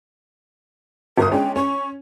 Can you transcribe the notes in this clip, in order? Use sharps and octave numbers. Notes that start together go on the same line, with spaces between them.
G1 A#4 D#6
G#3 C#4 D4 G5
C#4 C#6